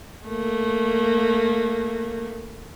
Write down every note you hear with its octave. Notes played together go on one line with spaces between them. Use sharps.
A3 A#3